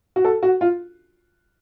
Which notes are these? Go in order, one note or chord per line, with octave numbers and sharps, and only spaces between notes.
F#4
A4
F#4
F4